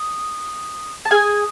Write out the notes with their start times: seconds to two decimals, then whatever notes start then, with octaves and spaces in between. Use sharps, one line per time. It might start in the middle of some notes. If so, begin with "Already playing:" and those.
Already playing: D#6
1.05 A5
1.11 G#4 G#5 D#6 F6